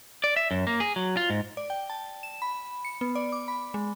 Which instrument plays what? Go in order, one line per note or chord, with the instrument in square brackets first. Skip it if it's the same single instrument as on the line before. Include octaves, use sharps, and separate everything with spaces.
[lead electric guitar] D5
E5
F#2
A#3
G#4
F#3
F4
G#2
[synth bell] D5
G5
A5
E7
B5
C#7
B3
D5
D6
B5
G#3